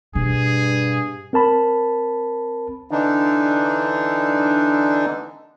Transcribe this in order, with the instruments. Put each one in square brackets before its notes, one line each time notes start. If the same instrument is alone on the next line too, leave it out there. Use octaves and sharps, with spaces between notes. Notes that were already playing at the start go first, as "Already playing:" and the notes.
[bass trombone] G2 [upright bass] B2 [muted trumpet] G#4
[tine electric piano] C4 A#4 A5 B5
[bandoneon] D3 E3 D4 D#4